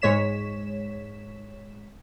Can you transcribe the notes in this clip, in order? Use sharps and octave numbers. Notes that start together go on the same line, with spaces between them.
G#2 G#3 C#5 B6 E7